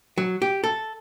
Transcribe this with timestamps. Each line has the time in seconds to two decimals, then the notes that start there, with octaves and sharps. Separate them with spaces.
0.18 F#3
0.42 G4
0.64 A4